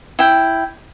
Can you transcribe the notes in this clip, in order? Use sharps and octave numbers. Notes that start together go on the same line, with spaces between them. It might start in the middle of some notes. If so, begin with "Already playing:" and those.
E4 G5